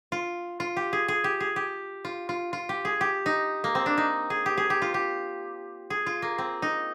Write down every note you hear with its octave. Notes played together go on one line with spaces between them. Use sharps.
F4
F4
G4
G#4
G#4
G4
G#4
G4
F4
F4
F4
G4
G#4
G4
D#4
A#3
C4
D4
D#4
G#4
G4
G#4
G4
F4
G4
G#4
F4
A#3
C4
D#4